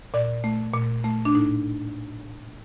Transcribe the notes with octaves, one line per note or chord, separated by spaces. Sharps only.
A#2 D5
A3
A#2
A3
D4
A2 D#4